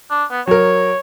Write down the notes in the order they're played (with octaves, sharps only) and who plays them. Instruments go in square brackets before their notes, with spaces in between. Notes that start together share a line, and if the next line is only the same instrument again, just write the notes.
[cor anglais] D4
B3
[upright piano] F#3 A#4 [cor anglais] C#5